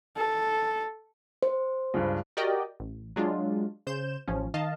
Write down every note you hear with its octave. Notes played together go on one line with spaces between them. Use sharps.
A4
C5
C#2 G2
F#4 G4 A#4 D5 D#5 G5
A1
F#3 G#3 D4 F4
C#3 C5 G6 E7
A1 F3 C#4
D#3 D#5 F5 A5